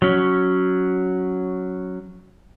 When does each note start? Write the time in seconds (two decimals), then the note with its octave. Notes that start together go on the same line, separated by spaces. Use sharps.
0.02 F#3 C#4